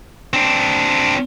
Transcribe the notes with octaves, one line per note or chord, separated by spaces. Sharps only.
C4 D4